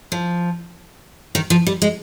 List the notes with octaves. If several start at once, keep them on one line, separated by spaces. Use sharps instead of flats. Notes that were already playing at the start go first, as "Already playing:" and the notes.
F3
D#3
F3
G3
G#3